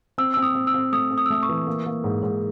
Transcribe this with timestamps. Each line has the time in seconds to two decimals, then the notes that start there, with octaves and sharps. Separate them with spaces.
0.18 C4 E6
0.34 E6
0.37 C4
0.42 D#6
0.55 C4
0.67 E6
0.74 C4
0.92 A3 D#6
1.11 C4
1.18 D#6
1.26 E6
1.30 A3 D#6
1.43 C#6
1.49 E3
1.67 A#3
1.86 A#3
2.04 G#2
2.23 G#2